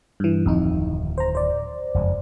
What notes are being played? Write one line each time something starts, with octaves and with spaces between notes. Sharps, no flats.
G2 E3
D1 F2 D#3 D#4
C5 A#5
C5 D5
F#1 F2 G#3